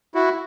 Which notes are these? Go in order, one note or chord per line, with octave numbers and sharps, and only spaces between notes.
E4 F#4